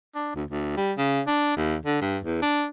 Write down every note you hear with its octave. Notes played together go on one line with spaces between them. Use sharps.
D4
D2
D2
G3
C#3
D4
D#2
D3
G2
E2
D4